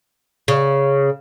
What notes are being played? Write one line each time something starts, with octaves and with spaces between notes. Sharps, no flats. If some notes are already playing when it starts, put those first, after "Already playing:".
C#3